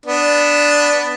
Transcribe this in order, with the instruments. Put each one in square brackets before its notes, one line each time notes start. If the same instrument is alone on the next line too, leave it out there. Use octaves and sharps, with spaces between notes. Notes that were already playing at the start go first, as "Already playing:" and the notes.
[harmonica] B3 D4